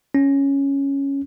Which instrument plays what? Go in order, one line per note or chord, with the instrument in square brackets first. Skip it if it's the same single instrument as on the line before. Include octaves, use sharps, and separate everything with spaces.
[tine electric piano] C#4